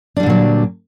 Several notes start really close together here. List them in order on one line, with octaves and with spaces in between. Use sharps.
D4 G3 D3 A#2 F#3